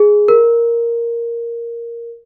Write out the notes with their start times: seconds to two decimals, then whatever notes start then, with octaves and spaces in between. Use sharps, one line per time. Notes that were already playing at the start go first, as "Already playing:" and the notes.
Already playing: G#4
0.28 A#4